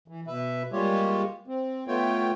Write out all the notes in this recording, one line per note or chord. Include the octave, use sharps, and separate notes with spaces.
E3
B2 B4 E5
G3 G#3 A#3 F4 G4 C#5
C4
A3 B3 F4 C#5 G5